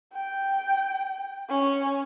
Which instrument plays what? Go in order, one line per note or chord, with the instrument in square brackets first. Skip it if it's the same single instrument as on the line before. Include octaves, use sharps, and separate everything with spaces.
[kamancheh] G5
C#4